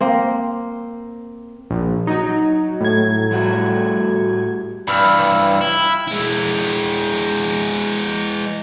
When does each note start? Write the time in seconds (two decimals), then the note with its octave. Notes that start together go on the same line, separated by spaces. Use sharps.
0.01 A#3 C4
1.70 A#1
2.07 F#3 D#4 F#4
2.81 A2 G#6
3.31 G3 A3 F#4
4.88 G2 E3 B5 E6 F6
5.61 E4
6.07 G#3 E4